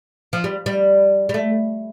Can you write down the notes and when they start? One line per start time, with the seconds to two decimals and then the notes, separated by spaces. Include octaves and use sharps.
0.33 F3
0.44 G3
0.66 G3
1.29 G3
1.34 A3